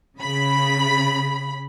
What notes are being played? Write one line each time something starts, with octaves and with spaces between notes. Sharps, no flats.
C#3 B5